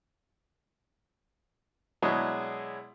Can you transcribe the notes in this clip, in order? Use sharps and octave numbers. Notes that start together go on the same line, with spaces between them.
B2 F#3 G#3 D4 E4 G#4